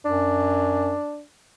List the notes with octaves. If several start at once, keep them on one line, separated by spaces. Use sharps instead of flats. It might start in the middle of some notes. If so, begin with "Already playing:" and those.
F#2 D4